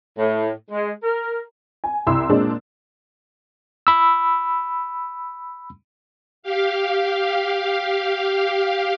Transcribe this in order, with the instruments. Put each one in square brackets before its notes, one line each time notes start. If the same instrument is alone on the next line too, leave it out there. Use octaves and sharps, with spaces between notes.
[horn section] A2
G#3
A#4
[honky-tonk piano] G#5
C2 E4 C6 E6
A#2 G#3 C4 D4
[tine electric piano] B5 E6
[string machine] G4 F5